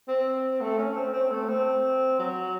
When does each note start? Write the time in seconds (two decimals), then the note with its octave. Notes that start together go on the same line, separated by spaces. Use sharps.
0.08 C4
0.61 A3
0.79 C#4
0.96 C4
1.13 C4
1.31 A3
1.49 C4
2.19 F#3